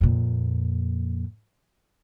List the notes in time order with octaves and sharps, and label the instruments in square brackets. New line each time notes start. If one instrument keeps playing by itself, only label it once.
[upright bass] F2 A#2